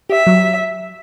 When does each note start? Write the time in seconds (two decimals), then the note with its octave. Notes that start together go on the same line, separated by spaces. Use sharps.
0.10 G4 E5
0.27 F#3